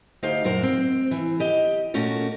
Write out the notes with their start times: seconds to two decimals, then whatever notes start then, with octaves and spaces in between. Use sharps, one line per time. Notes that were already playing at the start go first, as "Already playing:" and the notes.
0.23 D2 D#4 G4 C5 F5
0.44 F#2 A#2 F#4 A#4 C5
0.63 C4
1.11 E3
1.40 G4 D#5
1.94 A#2 A3 C#4 F#4 A#4